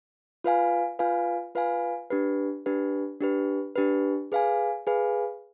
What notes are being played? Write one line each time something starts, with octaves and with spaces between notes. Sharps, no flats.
F4 B4 F5 G#5
F4 B4 F5 G#5
F4 B4 F5 G#5
D4 G4 B4
D4 G4 B4
D4 G4 B4
D4 G4 B4
G#4 B4 F5 G#5
G#4 B4 F5 G#5